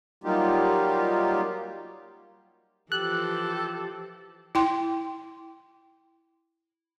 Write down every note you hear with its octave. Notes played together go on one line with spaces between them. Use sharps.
F#3 G3 A#3 D#4 F4 G4
E3 F3 G4 A4 F#6
E4 G5 C6